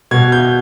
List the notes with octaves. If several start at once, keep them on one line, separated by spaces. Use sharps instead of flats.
B2 G#6
G6